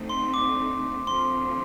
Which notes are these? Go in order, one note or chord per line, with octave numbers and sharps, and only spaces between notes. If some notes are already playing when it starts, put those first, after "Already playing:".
Already playing: D2 D3 A3 C4 D#4
C6
D6
D2 D3 F3 A3 C4 C6